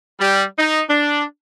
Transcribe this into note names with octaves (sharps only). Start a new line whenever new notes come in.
G3
D#4
D4